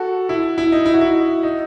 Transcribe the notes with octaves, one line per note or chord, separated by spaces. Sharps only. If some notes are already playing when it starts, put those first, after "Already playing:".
Already playing: F#4 A4
E4
E4
D#4
E4
F#4
E4
D#4